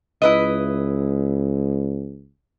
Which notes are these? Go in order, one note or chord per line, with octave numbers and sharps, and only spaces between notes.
C#2 E4 B4 D#5